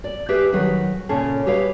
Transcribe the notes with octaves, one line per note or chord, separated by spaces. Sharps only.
D5
G4 G#4 B4 E5
D#3 F#3 G#4 B4
A#2 C#3 C#4 G#4 A4
G4 G#4 B4 C#5 F5